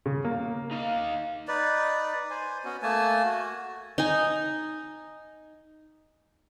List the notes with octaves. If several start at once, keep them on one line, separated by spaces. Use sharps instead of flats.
C#3
A#3
D#4 F5
D#4 B4 D5
C5 G#5
B3 C#4 F#4
A3 A#3 G#5 A5
F#4
D#4 G#5